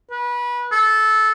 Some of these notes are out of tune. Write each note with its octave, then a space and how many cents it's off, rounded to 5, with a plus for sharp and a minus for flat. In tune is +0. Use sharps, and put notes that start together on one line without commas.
B4 -25
A4 -15